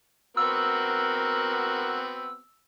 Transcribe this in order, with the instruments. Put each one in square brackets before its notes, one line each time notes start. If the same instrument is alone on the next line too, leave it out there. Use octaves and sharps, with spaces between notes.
[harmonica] B3 C4 F#4 [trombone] A#4 [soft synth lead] E6